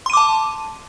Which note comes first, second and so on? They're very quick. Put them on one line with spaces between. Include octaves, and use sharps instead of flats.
C6 D#7 D6 A5